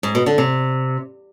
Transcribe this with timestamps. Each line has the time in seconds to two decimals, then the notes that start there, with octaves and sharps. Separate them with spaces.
0.03 G#2
0.15 B2
0.26 D3
0.38 C3